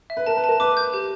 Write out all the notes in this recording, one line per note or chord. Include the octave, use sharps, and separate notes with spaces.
E5
B4
A#4 A5
B4
A#4 A5
B4 D6
G6
G4